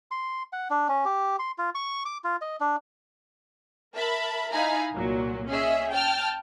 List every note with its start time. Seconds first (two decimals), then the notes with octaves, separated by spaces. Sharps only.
0.11 C6
0.53 F#5
0.70 D4
0.88 C#4
1.05 G4
1.39 C6
1.58 F4
1.75 C#6
2.05 D6
2.24 F4
2.41 D#5
2.60 D4
3.96 A#4 E5 A5 B5
4.52 D#4 E4 F5 G#5 A#5 B5
4.93 C2 A#2 F#3
5.48 C#4 G#4 D#5 E5
5.92 G5 A5 F6